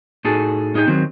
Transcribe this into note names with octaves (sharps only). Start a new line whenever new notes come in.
A2 D#4 F#4 G#4 A4 A5
A2 D#4 G#4 D5 G5
D#3 F#3 C4